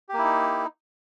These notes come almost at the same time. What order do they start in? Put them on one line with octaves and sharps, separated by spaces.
G4 A#3 E4 D#4